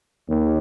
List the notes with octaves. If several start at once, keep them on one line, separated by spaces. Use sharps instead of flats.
D#2